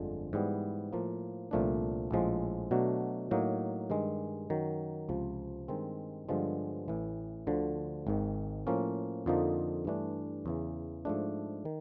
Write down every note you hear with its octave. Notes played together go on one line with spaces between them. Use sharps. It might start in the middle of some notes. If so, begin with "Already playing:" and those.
Already playing: G1 F2 D3 F3 G#3
G#2 E3 G3 B3
A2 F3 A#3
C2 A#2 F3 A3 D4
A#1 A2 F3 G#3
B2 F#3 A3 D4
A2 F#3 A#3 D#4
G2 D#3 G#3
F#2 D#3 F#3
C#2 C3 F3
G2 D#3 G#3 C4
G2 D3 F3 G#3 B3
A1 A2 E3
D2 D3 F3
G#1 G#2 D#3
A2 F3 A#3 C#4
F2 D3 F3 A#3 D#4
G2 E3 A3 D4
E2 C#3 E3
G#2 F3 A3 D4
D#3